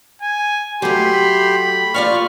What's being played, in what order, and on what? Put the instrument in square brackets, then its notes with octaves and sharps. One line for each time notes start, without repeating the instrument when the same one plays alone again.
[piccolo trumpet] G#5
[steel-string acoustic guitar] F#3 A3 [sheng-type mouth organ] G4 C6 [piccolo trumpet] B5
[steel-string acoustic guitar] F4 D5 F5 [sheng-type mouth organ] C#6 F6